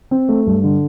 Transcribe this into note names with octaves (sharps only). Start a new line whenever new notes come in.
C4
A3
G2
D3